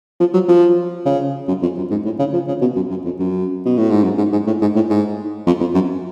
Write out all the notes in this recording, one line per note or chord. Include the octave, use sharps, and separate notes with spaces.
F3
F#3
F3
C#3
F#2
F2
F#2
G#2
A2
C#3
F3
C#3
B2
F#2
F#2
F2
F#2
B2
A2
G#2
F#2
G#2
G#2
A2
G#2
A2
G#2
F2
F2
F#2